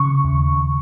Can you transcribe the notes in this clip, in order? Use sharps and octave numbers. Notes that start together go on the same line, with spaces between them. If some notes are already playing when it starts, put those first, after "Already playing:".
Already playing: C#3 C#6
D#2